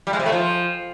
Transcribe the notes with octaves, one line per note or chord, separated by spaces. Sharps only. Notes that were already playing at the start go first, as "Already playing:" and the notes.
G3
G#3
C3
A3
F3